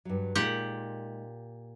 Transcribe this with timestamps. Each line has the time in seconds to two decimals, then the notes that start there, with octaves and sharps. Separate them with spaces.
0.05 G2 F#3
0.35 A#2 G#3 D#4 F4 G4 F#5